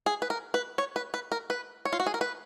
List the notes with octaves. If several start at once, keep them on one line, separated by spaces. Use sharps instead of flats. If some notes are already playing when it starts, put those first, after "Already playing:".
G#4
B4
A#4
B4
C#5
B4
B4
A#4
B4
C#5
F4
F#4
G#4
A#4
B4